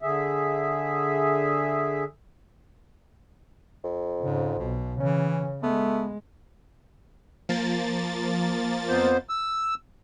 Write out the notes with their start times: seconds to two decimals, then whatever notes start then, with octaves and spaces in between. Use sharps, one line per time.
0.01 D3 G#4 E5
3.84 F2
4.22 G#2 C#3
4.59 B1 B2
5.00 C#3 E3 C#4
5.63 G#3 A3 B3
7.49 F3 A#3 A6
8.88 F2 B3 C5
9.29 E6